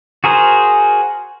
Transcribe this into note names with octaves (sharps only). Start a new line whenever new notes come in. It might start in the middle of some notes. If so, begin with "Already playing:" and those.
F#4 G#4 A#4 C5